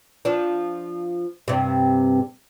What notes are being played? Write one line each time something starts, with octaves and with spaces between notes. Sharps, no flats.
F3 D4
G2 C3